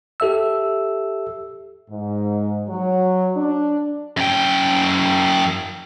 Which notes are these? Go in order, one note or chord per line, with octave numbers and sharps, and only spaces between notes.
G4 A4 E5 E6
G#2
F#3
D4
F#2 G5